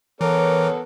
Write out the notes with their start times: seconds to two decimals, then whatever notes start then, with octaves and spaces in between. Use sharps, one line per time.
0.21 E3 B3 A4 A#4 C#5 D6